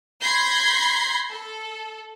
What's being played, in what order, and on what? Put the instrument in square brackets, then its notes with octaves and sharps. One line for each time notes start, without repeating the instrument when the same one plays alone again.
[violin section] B5 C6 G6 G#6 A#6 C7
A4